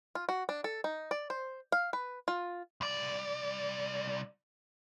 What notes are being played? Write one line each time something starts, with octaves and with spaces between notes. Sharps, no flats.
F4
F#4
D4
A4
D#4
D5
C5
F5
B4
F4
C2 D5